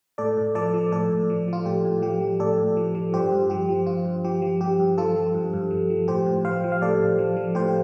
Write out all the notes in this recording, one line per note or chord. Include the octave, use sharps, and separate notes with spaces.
A2 A4 D5
A2
F3 A4 D5
F3
A2 A4 D5
A2
F3
F3 F4
A2 G4
A2
F3 G4
F3
A2 A4 D5
A2
F3
F3
G2 G4 C5
G2
F3 G4
F3
G2 F4
G2
F3 G4
F3
G2 G4
G2
F3 F4 A4
F3
G2
G2
F3
F3
A2 G4 C5
A2
F3 C5 F5
F3
F5
A2 A4 D5
A2
F3
F3
A2 G4 C5